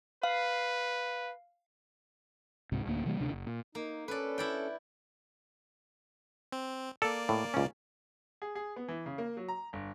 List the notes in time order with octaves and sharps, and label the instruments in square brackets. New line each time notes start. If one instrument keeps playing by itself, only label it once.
[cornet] B4 [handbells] F5
[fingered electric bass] C#2 G#2 C3
D1 D2 A#3
C3 E3 G3 A#3
D2 C3 D4
F#1
A#2
[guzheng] A#3 [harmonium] D#4
[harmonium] C#4 A4 [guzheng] B4 D5
[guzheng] E4 D5 G5
[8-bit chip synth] C4
[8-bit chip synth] A#3 D5 [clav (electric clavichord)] A4
[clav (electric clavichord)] A2
C#2 C#4
[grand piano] G#4
G#4
B3
E3
C#3
A#3
F#3
A#5
G1